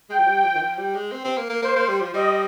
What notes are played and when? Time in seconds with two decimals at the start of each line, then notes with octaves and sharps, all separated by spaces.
0.10 G#3 G5
0.19 F3
0.27 G3
0.44 F3
0.55 D#3
0.61 F3
0.78 G3
0.95 G#3
1.12 C4
1.24 C4
1.37 A#3
1.50 A#3
1.62 A#3 C5
1.76 A#3
1.88 G3
2.01 F3
2.14 G3 D#5